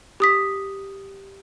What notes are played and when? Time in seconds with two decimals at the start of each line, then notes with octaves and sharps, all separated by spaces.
0.20 G4 D#6 B6